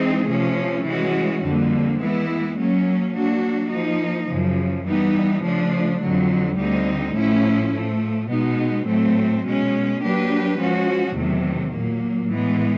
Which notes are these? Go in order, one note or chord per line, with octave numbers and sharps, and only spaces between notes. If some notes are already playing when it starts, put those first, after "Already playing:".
Already playing: E3 G#3 C4 D#4 G#4
C3 F3 A3 C#4
E3 G#3 C#4 F#4
F2 D3 G3 A#3
E3 G#3 B3 E4
F#3 A#3 C#4
F#3 A#3 D4 F#4
F3 A#3 D#4
F#2 C#3 F3
E3 G3 B3 D#4
C#3 F3 A3 D4
F2 D3 F#3
D2 D3 G3 C4 D#4
A2 F3 A3 C#4 E4
A2 F3 A3
B2 G#3 B3 D#4
A2 F#3 A3 C4
B2 G#3 C#4
F#3 A#3 D4 G4 B4
F3 G#3 C#4 F#4
E2 C3 D#3 F#3 A3
A#2 F#3 A#3
A2 E3 G#3 B3